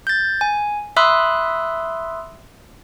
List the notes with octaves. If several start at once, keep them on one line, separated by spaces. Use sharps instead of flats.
G6 A6
G#5
E5 B5 C6 D#6 E6 F#6